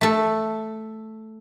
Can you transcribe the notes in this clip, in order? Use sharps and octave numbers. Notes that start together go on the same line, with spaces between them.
A3 A4